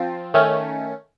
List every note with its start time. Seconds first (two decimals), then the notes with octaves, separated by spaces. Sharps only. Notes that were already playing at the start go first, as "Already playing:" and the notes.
Already playing: F3 C4 F4
0.34 D#3 A3 C#4